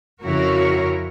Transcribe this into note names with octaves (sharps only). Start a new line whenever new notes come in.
F2 C#3 E4 F#4 A#4 C#5